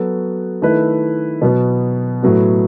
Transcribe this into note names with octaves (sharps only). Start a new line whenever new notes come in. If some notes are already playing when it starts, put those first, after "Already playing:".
Already playing: F#3 B3 F#4 A4
D#3 A3 E4 B4
B2 F#3 B3
A2 F#3 B3 F#4